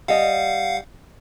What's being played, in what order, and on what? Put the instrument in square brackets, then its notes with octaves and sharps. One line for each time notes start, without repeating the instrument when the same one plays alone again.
[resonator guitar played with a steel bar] G3 D#5 [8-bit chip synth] F5 F#5